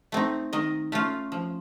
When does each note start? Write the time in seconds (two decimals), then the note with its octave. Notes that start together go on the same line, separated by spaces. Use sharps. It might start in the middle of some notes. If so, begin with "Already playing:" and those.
0.12 A3 C4 D#4
0.53 D#3 D#5
0.92 A3 C#4 F4
1.32 F3